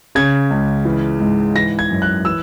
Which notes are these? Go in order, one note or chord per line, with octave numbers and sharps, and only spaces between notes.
C#3 G#6
C#2
E3
G#2
E3 A#6
G#6
F#2
F#6
E3 E6